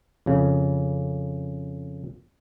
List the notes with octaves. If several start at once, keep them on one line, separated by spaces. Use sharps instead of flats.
F2 C#3